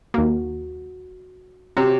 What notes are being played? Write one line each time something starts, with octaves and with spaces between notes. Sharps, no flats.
D#2 A#3 F#4
C3 F#4 G4 C#5